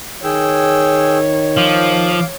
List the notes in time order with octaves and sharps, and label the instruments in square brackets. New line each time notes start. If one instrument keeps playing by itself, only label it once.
[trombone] D#3 [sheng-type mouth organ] G#4 G5 E6 [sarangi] C#5
[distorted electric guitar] F3 [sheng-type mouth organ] F5 D6